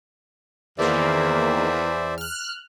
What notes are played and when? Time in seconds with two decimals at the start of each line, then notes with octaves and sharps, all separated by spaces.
0.79 E2 D#3 A#3 C5 D5 E5
2.18 F6 F#6